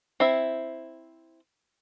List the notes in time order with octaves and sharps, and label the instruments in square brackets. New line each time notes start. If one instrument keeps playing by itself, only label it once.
[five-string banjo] C4 E4 E5